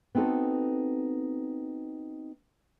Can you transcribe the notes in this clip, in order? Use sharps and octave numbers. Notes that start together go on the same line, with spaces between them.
B3 C4 D#4 F#4 A4